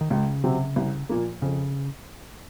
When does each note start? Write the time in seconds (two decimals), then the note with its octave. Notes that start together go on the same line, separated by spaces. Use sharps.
0.01 D#3
0.10 C#2 C#3
0.44 C3 F#3 C4
0.76 C2
1.09 A#2 F3 A#3
1.42 F2 C#3